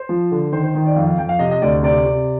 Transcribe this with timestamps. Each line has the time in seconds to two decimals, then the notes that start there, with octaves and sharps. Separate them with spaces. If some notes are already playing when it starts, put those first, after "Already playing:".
Already playing: C5
0.09 F3
0.31 D3
0.52 D#3 C5
0.64 C5
0.75 D#3 C5
0.86 D5
0.96 F2 F5
1.07 F5
1.18 F2 G5
1.29 F5
1.39 C3 D#5
1.51 D#5
1.62 D2 D5
1.83 C3 D5
2.06 C3